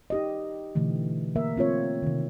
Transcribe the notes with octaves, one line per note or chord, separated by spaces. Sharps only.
D#4 G4 D#5
B2 D3 E3 A3
A#3 A#4 E5
A3 C4 F4 C#5
C3 D#3